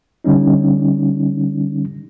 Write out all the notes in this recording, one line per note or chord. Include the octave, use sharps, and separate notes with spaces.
D3 G3 C#4 D#4